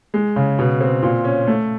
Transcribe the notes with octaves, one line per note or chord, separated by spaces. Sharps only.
G#3
C#3
B2
C4
A#2
C#4
A3